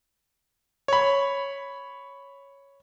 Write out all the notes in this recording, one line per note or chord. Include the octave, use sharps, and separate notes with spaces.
C#5 B5